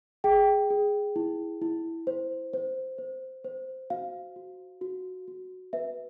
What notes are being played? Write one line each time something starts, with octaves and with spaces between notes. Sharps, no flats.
G#4 G5
G#4
E4
E4
C5
C5
C5
C5
F#4 F5
F#4
F#4
F#4
B4 E5